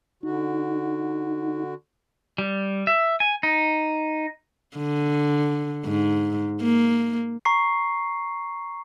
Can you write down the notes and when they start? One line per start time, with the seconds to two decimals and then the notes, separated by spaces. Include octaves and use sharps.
0.23 D3 D#4 F#4
2.38 G3
2.87 E5
3.20 G#5
3.43 D#4
4.76 D3
5.85 G#2
6.62 A#3
7.45 A#5 C#6 C7